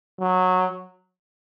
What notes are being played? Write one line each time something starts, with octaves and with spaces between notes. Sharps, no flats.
F#3